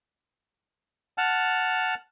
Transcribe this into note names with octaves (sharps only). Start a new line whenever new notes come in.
F#5 A5 F6